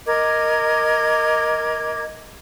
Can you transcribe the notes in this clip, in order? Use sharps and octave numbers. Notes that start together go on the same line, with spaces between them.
A#4 D#5 D6 G#6